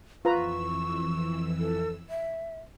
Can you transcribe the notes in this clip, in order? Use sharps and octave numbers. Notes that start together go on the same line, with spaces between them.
F2 E3 F4 B4 A#5 C#6 E6
A4
E5